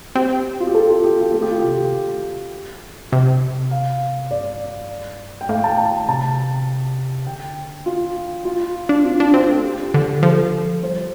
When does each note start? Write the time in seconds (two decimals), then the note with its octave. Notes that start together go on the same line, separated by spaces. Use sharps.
0.15 C4 G4
0.60 F4
0.67 G4
0.75 A4
0.90 F4
1.04 G4
1.19 F4
1.34 A3 A4
1.42 G4
1.51 F4
1.59 C3 G4
3.12 C3
3.71 F5
4.31 G2 D5
5.41 G5
5.49 A2 F5
5.59 G5
5.64 A5
5.78 A5
6.08 C3 A5
7.27 D3 G5
7.86 F4
8.45 G3 F4
8.89 D4
9.04 C4 F4
9.20 D4
9.33 C4 F4
9.50 A3
9.64 G4
9.94 D3
10.23 F3 A4
10.83 G3 C5